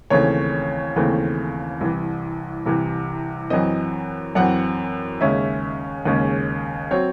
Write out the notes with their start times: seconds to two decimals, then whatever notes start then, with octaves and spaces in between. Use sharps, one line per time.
0.10 D#2 C#3 E3 A3 C4 C#5
0.96 D#2 C#3 E3 A3 C4
1.81 C2 C3 E3
2.66 C2 C3 E3
3.50 F#2 E3 C4 D#5
4.35 F#2 E3 C4 F#5
5.21 D#2 C#3 G#3 C#4 E5
6.05 D#2 C#3 G#3 C#4
6.91 F#3 C4 C#5